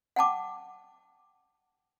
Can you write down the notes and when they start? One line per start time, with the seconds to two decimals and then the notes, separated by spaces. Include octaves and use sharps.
0.16 F#5 G5 A5 D6